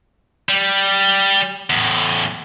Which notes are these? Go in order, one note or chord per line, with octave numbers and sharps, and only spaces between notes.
G3
E2 A2